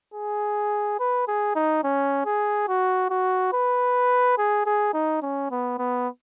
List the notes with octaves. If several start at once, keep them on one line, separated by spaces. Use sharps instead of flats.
G#4
B4
G#4
D#4
C#4
G#4
F#4
F#4
B4
G#4
G#4
D#4
C#4
B3
B3